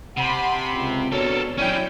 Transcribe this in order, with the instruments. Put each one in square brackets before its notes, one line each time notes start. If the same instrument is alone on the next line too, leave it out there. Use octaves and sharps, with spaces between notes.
[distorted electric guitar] C3 [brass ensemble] F#5 [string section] A5 B5 C6
[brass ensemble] C#2
[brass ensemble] B3 F#4 [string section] D4 C#5 [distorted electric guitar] A4 A#4
[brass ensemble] F#3 C#5 D5 [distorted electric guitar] C#4 G4 [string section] E4 G5 G6